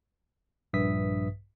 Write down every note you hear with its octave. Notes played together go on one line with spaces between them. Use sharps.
A#1 G2 B4 E5 D#6 B6